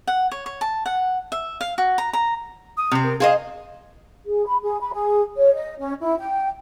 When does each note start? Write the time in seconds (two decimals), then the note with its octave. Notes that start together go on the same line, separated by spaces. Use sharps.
0.07 F#5
0.31 C#5
0.46 C#5
0.61 A5
0.86 F#5
1.32 E5
1.61 F5
1.78 F#4
1.98 A#5
2.13 A#5
2.77 D#6
2.91 C3 C4
3.04 A#4
3.20 G#4 C5 D#5 F5
4.26 G#4
4.45 B5
4.62 G#4
4.81 B5
4.93 G#4
5.37 C#5
5.55 D#5
5.79 C#4
6.02 E4
6.18 G5